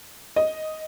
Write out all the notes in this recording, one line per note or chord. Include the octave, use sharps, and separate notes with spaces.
D#5